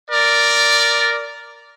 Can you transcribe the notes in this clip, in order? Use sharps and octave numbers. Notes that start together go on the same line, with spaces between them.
A#4 D5